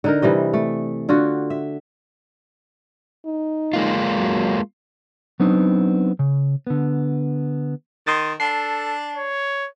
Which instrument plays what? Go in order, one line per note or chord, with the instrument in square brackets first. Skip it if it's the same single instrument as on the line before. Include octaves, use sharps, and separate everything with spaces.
[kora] D3 D#4 A#4
C3 E3 G3 D#5
A3
D3 F4 F#4
E5
[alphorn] D#4
[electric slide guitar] G#3 A#3 F4
[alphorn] F#3
[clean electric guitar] F#3 B3 C4 D4 D#4
C#3
D3 B3
[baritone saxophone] D#3 [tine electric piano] C6 D#6 A6
[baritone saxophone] D4 [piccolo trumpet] A4 [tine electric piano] C7
[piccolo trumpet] C#5